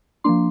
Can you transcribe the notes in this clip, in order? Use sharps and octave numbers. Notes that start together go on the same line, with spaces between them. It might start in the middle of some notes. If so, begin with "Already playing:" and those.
F3 A#3 D4 C6